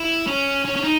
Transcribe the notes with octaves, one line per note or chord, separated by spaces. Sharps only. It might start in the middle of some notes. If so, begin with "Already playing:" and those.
Already playing: E4
C#4
C#4
C#4
D#4